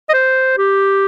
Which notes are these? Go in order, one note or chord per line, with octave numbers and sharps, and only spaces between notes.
D#5
C5
G4